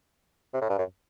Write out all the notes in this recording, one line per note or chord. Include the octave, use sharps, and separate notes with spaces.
C3
A2
G2
F#2